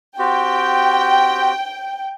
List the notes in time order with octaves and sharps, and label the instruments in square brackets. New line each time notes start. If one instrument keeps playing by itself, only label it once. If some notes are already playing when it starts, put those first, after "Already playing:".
[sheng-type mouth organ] C4 F#4 G4 [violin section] G5